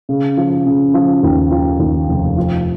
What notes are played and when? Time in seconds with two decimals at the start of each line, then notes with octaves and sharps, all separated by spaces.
0.09 C#3
0.37 F3
0.66 C#3
0.94 F3
1.23 D#2
1.51 F3
1.79 D#2
2.08 F1
2.37 F3